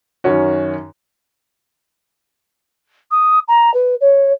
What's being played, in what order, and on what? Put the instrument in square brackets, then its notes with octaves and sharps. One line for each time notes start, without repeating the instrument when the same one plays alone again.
[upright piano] F#2 D#3 C#4 F#4
[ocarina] D#6
A#5
B4
C#5